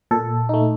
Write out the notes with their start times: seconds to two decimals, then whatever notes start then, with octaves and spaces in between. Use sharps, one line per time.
0.11 A#2 A4
0.49 A3 D#4